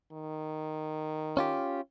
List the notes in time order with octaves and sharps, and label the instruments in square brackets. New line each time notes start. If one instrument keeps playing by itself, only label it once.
[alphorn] D#3
[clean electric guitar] C#4 F4 G4